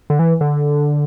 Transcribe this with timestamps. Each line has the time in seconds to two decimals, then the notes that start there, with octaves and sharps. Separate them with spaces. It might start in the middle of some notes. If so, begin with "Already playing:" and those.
0.10 D3
0.19 E3
0.41 D3